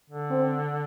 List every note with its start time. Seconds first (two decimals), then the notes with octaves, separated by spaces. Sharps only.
0.10 D3
0.30 C4